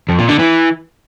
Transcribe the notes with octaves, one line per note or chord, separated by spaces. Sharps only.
F2
A#2
D3
E3